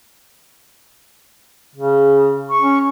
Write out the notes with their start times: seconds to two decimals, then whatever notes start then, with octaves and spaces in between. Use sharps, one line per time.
1.76 C#3
2.50 C#6
2.61 C#4